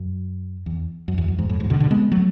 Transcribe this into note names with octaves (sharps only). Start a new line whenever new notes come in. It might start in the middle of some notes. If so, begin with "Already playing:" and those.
Already playing: F#2
E2
F#2
E2
F#2
E2 G#2
F#2 A2
E2 G#2
B2 D3
B2 D3
G#3 B3
F#3 A3